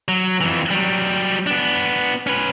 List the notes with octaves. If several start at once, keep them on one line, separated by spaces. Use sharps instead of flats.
F#3
F2 E3
F#3 G3
B3 D4
C#4 B4